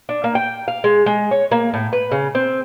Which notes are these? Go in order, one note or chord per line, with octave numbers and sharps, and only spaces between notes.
D4
A#3
G5
F5
G#3
G#3
C#5
A#3
A2
B4
C#3
C4